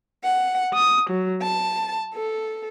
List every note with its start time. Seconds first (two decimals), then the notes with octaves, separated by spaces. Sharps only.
0.24 F#5
0.74 D#6
1.10 F#3
1.41 A5
2.15 A4